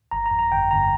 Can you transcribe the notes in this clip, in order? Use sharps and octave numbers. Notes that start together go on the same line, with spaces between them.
G1 A#5
A#5
F2
A#5
G1 G5
G1 A#5